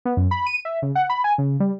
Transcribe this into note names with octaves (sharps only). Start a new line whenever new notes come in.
B3
F#2
B5
D#7
E5
C#3
F#5
B5
G#5
C#3
G3